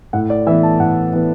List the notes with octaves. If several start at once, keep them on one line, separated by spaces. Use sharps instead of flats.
A2 F#5
D5
E3 B3 E5
A5
A2 F#5
E3 B3